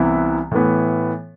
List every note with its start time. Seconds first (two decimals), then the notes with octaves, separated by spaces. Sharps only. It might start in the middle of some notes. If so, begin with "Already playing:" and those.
Already playing: C2 C3 E3 B3 E4
0.51 A2 E3 B3